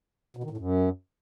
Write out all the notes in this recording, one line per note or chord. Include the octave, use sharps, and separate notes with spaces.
B2
D#3
A2
F#2